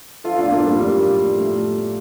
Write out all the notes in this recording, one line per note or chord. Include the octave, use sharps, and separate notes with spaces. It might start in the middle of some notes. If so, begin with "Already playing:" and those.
F3 F4 A4
A2 D4 F4
A#3 D4
F3
G3 A#3
A2 G3
F3
A2
F3 A3
A2
F3